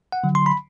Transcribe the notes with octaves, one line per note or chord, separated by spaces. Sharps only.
F#5
D3 F#3
C6
B5